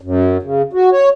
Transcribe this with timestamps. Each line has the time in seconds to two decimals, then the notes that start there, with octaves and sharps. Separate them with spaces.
0.01 F#2
0.43 C#3
0.73 F#4
0.92 C#5